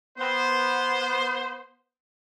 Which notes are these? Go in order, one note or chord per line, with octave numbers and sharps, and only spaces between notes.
B3 C5